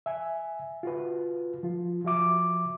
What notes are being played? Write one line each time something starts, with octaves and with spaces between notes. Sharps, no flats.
E5 G#5
F4 F#4 B4
F3 F4
F3 F#4 E5 D6